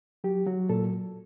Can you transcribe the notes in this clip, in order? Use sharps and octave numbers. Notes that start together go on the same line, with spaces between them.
F#3 G4
F#3 F#4
A#2 A4